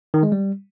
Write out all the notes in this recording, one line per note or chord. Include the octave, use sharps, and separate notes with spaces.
D#3
G#3
G3